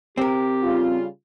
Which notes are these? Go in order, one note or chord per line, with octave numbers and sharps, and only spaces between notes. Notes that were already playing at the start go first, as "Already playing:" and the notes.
C4 G4 A#4
C#3 G3 F4